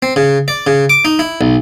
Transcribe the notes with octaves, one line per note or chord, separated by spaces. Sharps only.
C4
C#3
D5
C#3
D6
D#4
E4
B1